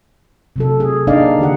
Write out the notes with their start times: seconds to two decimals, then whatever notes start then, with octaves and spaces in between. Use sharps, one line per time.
0.56 C3 F#3 A4
0.80 G#4
1.07 A#3 D4 D#4 D5 D#5 F5
1.39 D3 D#3 G4 F#5